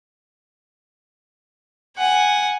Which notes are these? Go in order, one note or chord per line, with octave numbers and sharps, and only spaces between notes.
F#5 G#5